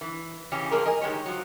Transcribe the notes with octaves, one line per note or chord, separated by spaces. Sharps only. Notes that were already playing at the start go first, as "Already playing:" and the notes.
E3
C#3 E3 C#4 G4
F3 G#3 A#3 G#4 A#4
A#4 D#5 G#5
D#3 G#3 G4 C#5
F3 F#3